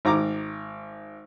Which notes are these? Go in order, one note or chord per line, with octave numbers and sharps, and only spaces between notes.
G#1 A#5 D6